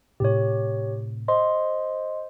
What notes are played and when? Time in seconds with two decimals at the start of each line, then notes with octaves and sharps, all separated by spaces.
0.20 A2 C3 G4 C#5
1.28 C5 D#5 C6